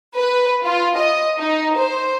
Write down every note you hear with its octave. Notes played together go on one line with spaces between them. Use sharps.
B4
F4
D#5
D#4
C5